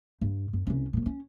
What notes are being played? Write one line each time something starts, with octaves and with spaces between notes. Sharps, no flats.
G2
F#2
C2 C#4
A#2 D#3
C#4